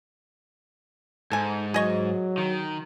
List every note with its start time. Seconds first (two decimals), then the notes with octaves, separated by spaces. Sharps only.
1.32 G#2 A4 G#5
1.74 F#3 G#4 D#5 C#6
2.38 D#3